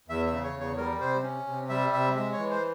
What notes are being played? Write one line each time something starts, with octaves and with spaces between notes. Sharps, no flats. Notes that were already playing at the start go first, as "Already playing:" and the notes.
E2 E5
E5
C#3
C#5
E2
C#5
G3 A#4
C3 C5
C#4
C3
G3 E5
C3 E5
G#3 E5
C#5
E3
C5